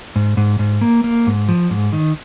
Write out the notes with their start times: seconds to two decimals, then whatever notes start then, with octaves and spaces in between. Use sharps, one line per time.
0.16 G#2
0.37 G#2
0.59 G#2
0.81 A#3
1.04 A#3
1.27 G#2
1.49 F3
1.71 G#2
1.93 D#3